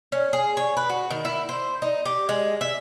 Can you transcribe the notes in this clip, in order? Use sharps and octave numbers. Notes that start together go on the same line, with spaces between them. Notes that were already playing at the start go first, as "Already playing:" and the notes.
C#4
G#4
C#5
B4
F#4
D#3
E4
C5
D#4
G4
G#3
E5